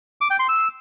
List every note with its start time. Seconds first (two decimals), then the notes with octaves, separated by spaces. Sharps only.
0.21 D6
0.30 G5
0.39 C6
0.49 E6